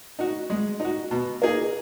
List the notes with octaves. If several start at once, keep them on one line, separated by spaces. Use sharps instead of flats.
D#4 F#4
G#3
D#4 F#4
B2
A#3 D#4 G#4